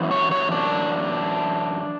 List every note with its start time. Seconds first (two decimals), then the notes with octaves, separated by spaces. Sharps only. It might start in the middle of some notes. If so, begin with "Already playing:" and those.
Already playing: F#2 E3
0.11 C#5
0.31 C#5
0.51 D4